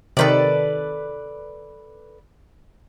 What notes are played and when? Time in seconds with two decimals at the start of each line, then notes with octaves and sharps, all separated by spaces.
0.17 C3 D#3 A4 B4 D5